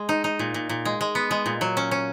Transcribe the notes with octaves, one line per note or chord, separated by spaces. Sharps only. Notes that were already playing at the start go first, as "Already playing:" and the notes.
Already playing: G#3
D#4
D#4
A#2
A#2
A#2
G#3
G#3
B3
G#3
A#2
F#3
C#4
C#4